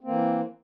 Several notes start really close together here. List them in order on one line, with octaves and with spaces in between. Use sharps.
C4 A#3 E3